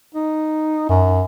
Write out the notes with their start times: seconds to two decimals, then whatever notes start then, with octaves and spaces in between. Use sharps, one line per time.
0.15 D#4
0.89 F#2